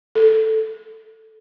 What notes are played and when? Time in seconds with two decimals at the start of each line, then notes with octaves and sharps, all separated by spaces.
0.15 A4